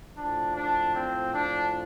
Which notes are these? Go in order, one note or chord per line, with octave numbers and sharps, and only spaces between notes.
A2 F3 D4
D4
C4
D4